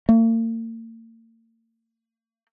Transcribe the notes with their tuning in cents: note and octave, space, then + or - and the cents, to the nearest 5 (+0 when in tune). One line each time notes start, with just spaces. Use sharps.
A#3 -45